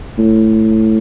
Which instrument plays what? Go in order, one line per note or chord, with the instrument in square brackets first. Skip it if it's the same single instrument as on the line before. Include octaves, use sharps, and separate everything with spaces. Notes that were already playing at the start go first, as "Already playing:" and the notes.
[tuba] A2